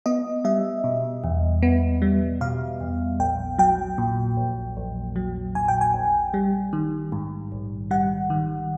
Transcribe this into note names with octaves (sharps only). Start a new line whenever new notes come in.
B3 D#5
G3 E5
B2
E2
B3
G3
B2 F5
E2
A#1 G5
F#3 G5
A#2
A#1
A#1
F#3
A#2 G#5
G5
G#5
A#1
G3
D#3
G#2
A#1
G3 F#5
D#3